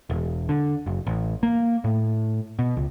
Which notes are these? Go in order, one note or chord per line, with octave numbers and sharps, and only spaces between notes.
E1
D3
F#1
A1
A#3
A2
B2
C#2